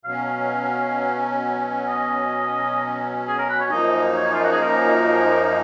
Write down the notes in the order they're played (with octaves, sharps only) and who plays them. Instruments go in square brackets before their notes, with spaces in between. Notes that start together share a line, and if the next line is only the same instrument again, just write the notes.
[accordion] B2 F#3 C#4 [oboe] F5
[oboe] D#5
G#4
A#4
B4
C#5
[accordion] F#2 F3 A#3 D#4 [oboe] D#5
[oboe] C#5
F4
F#4
G#4
A#4